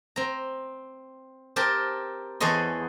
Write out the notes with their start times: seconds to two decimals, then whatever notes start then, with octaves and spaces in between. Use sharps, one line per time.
0.16 C4 A#5
1.56 C4 G4 A#4 A5
2.40 E2 G#4 A4 C#5 D#5 C6